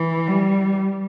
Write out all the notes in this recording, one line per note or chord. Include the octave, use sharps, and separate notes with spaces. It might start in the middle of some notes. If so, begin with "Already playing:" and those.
Already playing: E3
G3